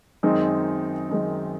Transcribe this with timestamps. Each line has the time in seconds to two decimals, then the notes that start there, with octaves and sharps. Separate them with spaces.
0.23 F#2 D#3 G#3 C4 D#4
1.09 F#2 D#3 G#3 C4 D#4